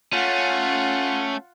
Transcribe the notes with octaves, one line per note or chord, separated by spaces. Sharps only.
A3 C#4 F4 F#5